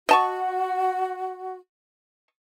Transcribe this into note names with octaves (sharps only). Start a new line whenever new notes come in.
F#4 D#5 A5 C#6